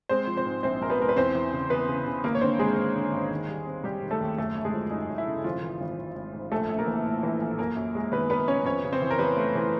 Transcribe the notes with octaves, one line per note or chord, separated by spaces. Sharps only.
G#3 C4 C5
F3
C4 C5
G#2
A#1 C4 C5
A#1 A#4
B3 B4
G#3 A#4
B4
E2 C4 C5
E3
C#3
E3 B3 B4
C#3
C#3
G#1 A#3 A#4
C#5
D3 C4 C5
G#1 G#3 G#4
G#1
D3
G#1
D#3
G3
C4
G3 G4
D#3
A3 A4
D#2
F#2 A3 A4
G1
G#3 G#4
F3
F#2 D#4
F#2
E4
C#3
G#1 F3 F4
E3
G#1
G#1
G#1
G#2
A#1 A3 A4
A#1
A#3 A#4
E3
A2
E3
A#1
F#2 A#3 A#4
F#2
G#3
D#3 B3 B4
B3 B4
B3 C#4 C#5
F2 C#4 C#5
C#3
C4 C5
E3
A#4
E3 B3 B4
A3
E3